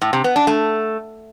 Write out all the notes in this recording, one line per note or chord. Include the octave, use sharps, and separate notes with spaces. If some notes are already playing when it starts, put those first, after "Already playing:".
A2
C3
B3
D4
A3